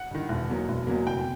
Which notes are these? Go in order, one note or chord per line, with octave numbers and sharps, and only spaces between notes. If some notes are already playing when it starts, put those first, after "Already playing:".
Already playing: F#5
G2 D#3
E1
E2 B2 F#3 A#3
E1
E2 B2 F#3 A#3
F1 G5